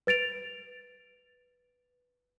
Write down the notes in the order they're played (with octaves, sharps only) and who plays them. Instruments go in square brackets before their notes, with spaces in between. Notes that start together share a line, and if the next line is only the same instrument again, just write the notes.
[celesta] B4 A6 D7 F7